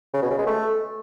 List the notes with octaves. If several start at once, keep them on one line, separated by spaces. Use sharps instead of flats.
C#3
B2
C#3
G#3
A3